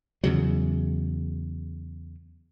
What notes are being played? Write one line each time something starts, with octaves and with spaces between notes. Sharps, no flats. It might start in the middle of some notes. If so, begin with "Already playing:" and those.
E2 C#3 F#3